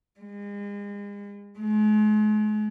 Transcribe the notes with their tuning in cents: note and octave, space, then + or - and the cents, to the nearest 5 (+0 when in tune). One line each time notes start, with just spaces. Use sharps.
G#3 -40
G#3 +40